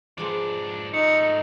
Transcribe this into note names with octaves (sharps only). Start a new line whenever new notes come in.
G#2 F3 G#3 B3 D4
G#2 A3 D#4 C#7